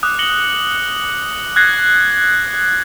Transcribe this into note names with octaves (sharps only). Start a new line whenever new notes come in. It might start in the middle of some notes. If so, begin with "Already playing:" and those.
D6 D#6 F#6
A#6 C#7 F#7 G7
F#6 G#6 A#6 C7